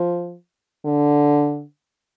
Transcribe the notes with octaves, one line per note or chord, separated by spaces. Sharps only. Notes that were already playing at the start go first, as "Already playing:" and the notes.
Already playing: F3
D3